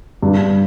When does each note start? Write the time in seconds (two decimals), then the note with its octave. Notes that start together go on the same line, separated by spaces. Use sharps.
0.23 G2